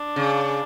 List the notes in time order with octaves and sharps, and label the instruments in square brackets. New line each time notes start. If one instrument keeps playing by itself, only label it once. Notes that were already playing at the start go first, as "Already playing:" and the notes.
Already playing: [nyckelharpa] D4
[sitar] C#3